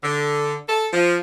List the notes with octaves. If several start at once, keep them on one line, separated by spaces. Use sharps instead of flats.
D3
A4
F3